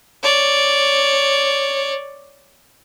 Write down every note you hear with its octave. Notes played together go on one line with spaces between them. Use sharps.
C#5 D5